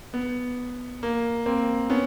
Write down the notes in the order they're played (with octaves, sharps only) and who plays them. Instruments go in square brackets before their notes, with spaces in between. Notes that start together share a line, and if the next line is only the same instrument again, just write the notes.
[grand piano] B3
A#3
A#3 C4
B3 C#4